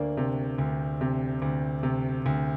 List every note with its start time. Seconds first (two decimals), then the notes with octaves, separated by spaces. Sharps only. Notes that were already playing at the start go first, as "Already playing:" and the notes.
Already playing: D2 A#3 D4
0.17 C3
0.58 D2
1.01 C3
1.42 D2
1.83 C3
2.26 D2